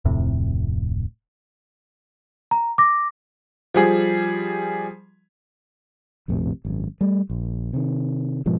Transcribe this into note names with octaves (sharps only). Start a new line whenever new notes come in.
D1 F2 A2 C3
A#5
D6 A#6
F3 G3 G#4
A#1 F2 A2 C3
G#1 F#2
G3 A3
A#1
C3 D#3
G#2 B2 F3 G#3